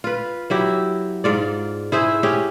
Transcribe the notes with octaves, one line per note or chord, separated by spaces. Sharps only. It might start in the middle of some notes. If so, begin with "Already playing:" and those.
F4 B4
F#3 E4 G4
G#2 F4 D5
E4 G#4 C5 E5
C#4 G4 G#4